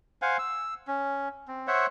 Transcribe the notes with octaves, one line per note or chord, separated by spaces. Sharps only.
C5 F5 F#5 G#5
E6
C#4
C4
C5 C#5 E5 F#5